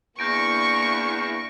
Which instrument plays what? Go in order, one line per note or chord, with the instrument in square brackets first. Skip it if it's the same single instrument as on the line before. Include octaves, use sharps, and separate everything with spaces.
[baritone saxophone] E2 [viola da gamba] A#3 D4 E4 [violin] C#6 [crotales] G6 A#6 D7